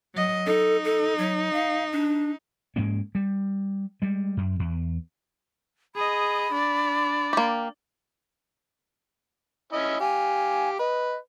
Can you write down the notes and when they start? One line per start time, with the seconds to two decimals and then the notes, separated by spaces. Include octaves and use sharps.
0.14 F#3 D#5
0.46 D#4 A4
0.85 A4
1.18 F#3
1.53 F5
1.92 D4
2.76 G#2 G#3 A#3 C#4
3.15 G3
4.02 G3 G#3
4.37 F#2
4.59 E2
5.95 G#4 D#5 B5
6.52 D4 D5
7.33 A#3 G4
9.72 C#4 E4 D#5
10.00 G4 F5 G#5
10.79 B4 D#5